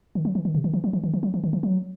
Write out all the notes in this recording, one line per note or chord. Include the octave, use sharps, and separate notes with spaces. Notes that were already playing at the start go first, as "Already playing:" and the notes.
D#3
F#3
E3
D#3
C3
D#3
E3
F#3
E3
D#3
E3
F#3
E3
D#3
E3
F#3